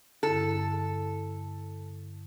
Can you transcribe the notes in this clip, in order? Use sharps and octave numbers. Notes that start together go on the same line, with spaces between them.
G2 D3 E4 A4